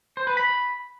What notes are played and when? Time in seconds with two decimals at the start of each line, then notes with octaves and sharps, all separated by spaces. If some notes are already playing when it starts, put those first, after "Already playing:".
0.17 C5
0.27 B4
0.37 B5